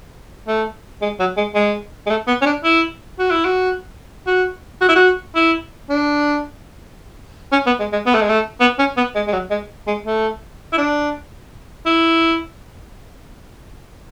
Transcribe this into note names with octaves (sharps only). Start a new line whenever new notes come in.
A3
G#3
F#3
G#3
G#3
G#3
A3
B3
C#4
D4
E4
F#4
E4
F#4
F#4
F#4
E4
F#4
E4
D4
C#4
B3
G#3
G#3
B3
A3
G#3
A3
B3
C#4
B3
G#3
G#3
F#3
G#3
G#3
A3
E4
D4
E4